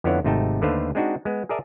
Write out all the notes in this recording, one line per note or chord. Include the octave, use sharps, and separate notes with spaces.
F2 D3 B3 E4 C#5 F#5
G#1 C3 A3 D#4 G5 A5
D#2 D3 A3 B4 C5 F5
G#3 C4 D4 D#4 F#4
G#3 B3
G#4 A#4 D5 E5 A5